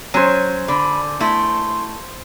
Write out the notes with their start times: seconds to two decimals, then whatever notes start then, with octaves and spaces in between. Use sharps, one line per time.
0.14 F#3 C#4 C5 G#5
0.68 D3 B5
1.20 A3 E4 C6